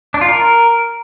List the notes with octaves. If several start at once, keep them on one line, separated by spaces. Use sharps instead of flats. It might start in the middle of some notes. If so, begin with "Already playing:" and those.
D4
F4
A#4